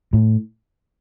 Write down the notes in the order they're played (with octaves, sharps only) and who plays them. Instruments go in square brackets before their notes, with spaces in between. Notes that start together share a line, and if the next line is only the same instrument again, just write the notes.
[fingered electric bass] A2